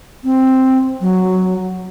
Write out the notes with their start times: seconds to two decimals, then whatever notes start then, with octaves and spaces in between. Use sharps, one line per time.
0.24 C4
1.01 F#3